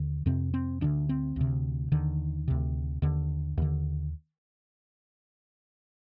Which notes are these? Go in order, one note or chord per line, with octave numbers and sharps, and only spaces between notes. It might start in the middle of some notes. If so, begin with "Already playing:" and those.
Already playing: D#2 D3
F2 C3 C4
C4
D2 D3 D4
C4
D2 C3
D#2 D3 D#3
D2 C3
D#2 D3
D#2 D3